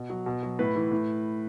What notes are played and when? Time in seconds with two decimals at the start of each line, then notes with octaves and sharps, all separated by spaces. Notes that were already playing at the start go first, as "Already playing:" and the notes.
Already playing: B2
0.10 F#3
0.26 B2
0.43 F#3
0.59 A2 B4
0.76 E3
0.92 A2